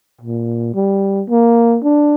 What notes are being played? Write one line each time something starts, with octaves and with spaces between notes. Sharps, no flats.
A#2
G3
A#3
D4